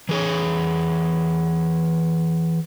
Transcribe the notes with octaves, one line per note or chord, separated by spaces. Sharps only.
E3 G#4 C#5